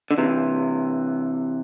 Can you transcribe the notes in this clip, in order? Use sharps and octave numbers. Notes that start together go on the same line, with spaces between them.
D3
C3 E3